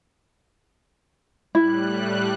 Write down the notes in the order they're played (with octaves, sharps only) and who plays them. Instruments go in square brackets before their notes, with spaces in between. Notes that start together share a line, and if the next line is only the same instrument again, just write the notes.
[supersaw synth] A2 G3 F#6 [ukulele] E4